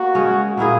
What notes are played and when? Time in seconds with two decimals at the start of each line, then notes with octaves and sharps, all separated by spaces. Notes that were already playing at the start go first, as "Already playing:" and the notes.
Already playing: A#3 F#4
0.15 C#3 G#3 C#4
0.57 A#2 A#3 E4 G#4